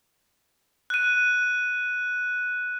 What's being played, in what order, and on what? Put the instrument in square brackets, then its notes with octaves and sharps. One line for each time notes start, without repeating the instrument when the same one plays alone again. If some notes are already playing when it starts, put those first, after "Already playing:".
[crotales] F#6 D#7